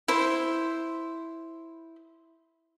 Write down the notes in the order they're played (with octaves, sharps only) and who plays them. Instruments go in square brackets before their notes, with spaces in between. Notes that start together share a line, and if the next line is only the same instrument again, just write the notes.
[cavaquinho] E4 C5